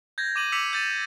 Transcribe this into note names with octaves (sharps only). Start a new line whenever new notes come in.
G6 G#6 A#6
D6 D#7 F#7
D6 E6 B6 C#7 F7 F#7
G6 A6 D#7